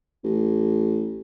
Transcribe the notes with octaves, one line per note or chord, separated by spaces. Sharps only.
A1